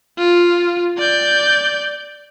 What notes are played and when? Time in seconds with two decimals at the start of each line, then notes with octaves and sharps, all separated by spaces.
0.18 F4
0.98 D5 G6